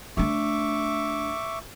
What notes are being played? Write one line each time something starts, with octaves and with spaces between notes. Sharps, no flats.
A3 D4 E5 C#6 D6